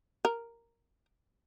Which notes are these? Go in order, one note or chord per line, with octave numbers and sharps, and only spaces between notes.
A#4